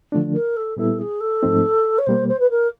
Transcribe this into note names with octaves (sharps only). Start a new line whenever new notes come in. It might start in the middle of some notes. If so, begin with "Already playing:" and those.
D3 F3 A3 D4
A#4
A4
A#2 G3 B3 E4 A4
G#4
A4
G#2 F3 A3 C4 D#4
C#5
B2 G3 A#3 C5
C5
B4
A#4